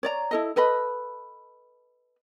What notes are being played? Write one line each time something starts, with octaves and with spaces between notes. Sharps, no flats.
C#5 D5 A#5
E4 A4 D#5
A4 B4 D#5 B5